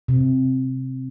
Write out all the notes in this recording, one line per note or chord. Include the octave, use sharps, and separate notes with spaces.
C3